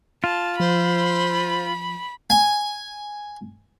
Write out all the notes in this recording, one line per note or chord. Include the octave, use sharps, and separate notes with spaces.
F4 A5
F3 C5 B5
G#5